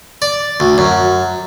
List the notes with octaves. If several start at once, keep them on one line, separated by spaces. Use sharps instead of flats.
D5
D2
F#2